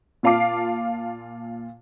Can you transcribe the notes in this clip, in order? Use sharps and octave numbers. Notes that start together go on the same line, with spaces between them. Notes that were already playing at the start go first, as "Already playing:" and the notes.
A#2 F4 F5 A5 D6 C7